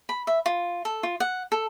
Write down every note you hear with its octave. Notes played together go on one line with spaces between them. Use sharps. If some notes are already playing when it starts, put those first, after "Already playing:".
B5
E5
F4
A4
F4
F#5
A4